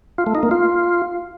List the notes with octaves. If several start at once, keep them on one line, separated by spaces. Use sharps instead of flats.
F4
A3
D#4
A#3
F4